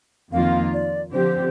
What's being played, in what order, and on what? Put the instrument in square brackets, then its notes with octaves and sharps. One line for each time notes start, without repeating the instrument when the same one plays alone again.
[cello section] F2 D#3 A#3 F4 [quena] F5
[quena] D5
[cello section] D3 F3 C4 G4 [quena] C5